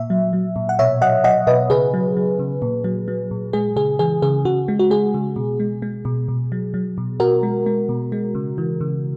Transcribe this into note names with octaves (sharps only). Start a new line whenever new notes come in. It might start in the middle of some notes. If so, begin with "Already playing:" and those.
Already playing: A#2 E5
F#3
F#3
A#2
F#5
B2 C#5 E5
F#3 D#5 F#5
F#3 D#5 F#5
B2 B4 D#5
C#3 G#4 B4
F#3
F#3
C#3
A#2
F#3
F#3
A#2
G#3 G#4
C#3 G#4
E3 G#4
C#3 G#4
C#3 F#4
G#3
F#4
G#3 G#4
C#3
B2
G#3
G#3
B2
B2
F#3
F#3
B2
B2 F#4 A#4
G#3
G#3
B2
G#3
C#3
E3
C#3